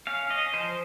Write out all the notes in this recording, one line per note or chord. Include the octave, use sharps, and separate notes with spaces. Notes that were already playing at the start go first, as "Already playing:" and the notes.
C#4 F5
C#4 D#5
F3 C5